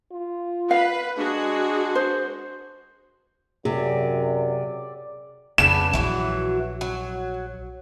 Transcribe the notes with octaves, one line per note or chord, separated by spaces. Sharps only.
F4
B4 F5
G#3 D4 F#4 G#4
C5
F#2 C3 G#4 D5
F2 C#3 B3 D4 E7
A#1 E3 F#3 F#4
F#3